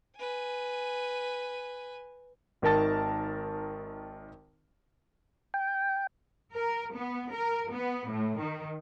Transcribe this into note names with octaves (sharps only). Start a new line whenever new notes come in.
B4 G#5
G#1 D#3 A#4 A5 A6
G5
A#4
B3
A#4
B3
A2
D#3